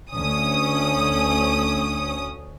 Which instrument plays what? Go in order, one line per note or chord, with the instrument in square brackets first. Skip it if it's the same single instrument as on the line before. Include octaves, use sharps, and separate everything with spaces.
[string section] D2 C#4 D#6